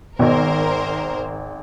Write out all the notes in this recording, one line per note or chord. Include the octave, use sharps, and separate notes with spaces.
G#1 B2 D#3 A#4 C5